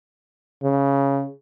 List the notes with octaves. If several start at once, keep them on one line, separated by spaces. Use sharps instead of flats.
C#3